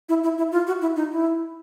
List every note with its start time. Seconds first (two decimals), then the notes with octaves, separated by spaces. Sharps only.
0.09 E4
0.23 E4
0.38 E4
0.52 F4
0.67 F#4
0.81 E4
0.96 D#4
1.12 E4